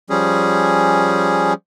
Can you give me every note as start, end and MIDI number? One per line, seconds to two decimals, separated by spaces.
0.10 1.53 53
0.10 1.53 55
0.10 1.53 61
0.10 1.53 68